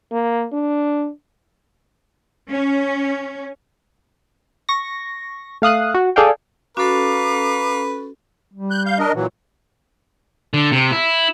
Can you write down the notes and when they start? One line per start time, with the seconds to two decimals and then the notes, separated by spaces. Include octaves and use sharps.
0.12 A#3
0.53 D4
2.48 C#4
4.69 C#6 A#6
5.62 A3 F5 D#6 F#6
5.94 F#4
6.16 G#4 A4 D5 F5 G5
6.77 C#4 F#4 A4 B4 F5 A#5 D6
8.54 G3
8.70 F#6 G6
8.85 F5 G6
8.99 D4 A#4 D#5
9.14 A#2 E3 F#3
10.54 D3
10.72 C3
10.92 E4